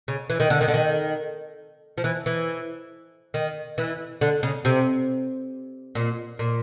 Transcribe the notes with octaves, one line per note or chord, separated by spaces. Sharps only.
C#3
E3
D#3
D3
D#3
D3
D#3
F3
E3
E3
D#3
E3
D3
C#3
C3
A#2
A#2